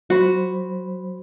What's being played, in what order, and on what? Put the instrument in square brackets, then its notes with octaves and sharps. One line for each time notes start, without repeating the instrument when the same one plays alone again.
[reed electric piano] F#3 C5 B5 [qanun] F#4